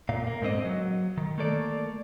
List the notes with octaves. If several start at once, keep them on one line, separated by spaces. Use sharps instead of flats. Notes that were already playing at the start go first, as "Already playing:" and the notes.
A#2 F5
A#3
G#2 D3 C4 D#5
F#3
D#3
A3 A#3 A4 D5